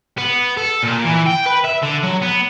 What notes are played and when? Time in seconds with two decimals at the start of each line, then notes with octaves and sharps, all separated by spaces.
0.18 B3
0.57 A4
0.83 A#2
1.05 E3
1.26 G5
1.46 B4
1.64 E5
1.82 D3
2.03 F#3
2.22 B3